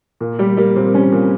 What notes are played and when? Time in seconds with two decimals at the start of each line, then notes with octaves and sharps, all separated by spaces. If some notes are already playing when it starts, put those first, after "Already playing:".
0.21 A#2
0.39 G3 G4
0.57 G3 A#3
0.76 A#2 C4
0.94 G3 C#4
1.12 A#2